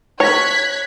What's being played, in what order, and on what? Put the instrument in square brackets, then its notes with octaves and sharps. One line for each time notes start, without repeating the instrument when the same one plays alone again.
[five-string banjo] C#5 [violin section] F#6 G#6 B6